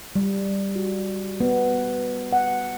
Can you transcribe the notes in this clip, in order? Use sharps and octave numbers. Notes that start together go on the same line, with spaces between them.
G3
F#4
B3
F#5